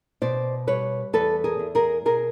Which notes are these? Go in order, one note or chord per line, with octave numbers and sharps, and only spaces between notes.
B2 C5 D5
G3 B4 C#5
E2 A4 B4
G#4 A#4
E2
G#4 A#4
B2 G#4 A#4